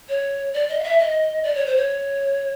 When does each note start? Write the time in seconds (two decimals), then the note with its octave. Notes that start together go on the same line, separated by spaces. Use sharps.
0.09 C#5
0.54 D5
0.69 D#5
0.80 F5
0.84 E5
0.99 D#5
1.44 D5
1.55 C#5
1.66 C5
1.77 C#5